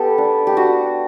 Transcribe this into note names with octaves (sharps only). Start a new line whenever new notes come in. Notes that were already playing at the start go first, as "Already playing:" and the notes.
Already playing: B3 G4 A4
D4
G4
D4 F#4